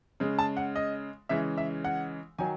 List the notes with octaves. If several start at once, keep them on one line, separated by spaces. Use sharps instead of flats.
C#3 G#3
A5
F#5
D#5
C#3 E3 G#3 E5
E5
F#5
D#3 F#3 G#5